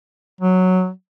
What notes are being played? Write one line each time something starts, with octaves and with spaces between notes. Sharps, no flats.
F#3